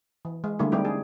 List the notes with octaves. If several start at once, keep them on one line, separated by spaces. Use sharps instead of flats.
E3
G#3
D3 G3 A3 A#3 E4
G3 G#3 C4 D#4 E4 G4
G#4